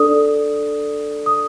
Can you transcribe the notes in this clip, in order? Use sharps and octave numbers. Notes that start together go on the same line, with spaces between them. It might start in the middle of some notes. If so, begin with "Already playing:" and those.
Already playing: D4 A4 D5 D#6
D#6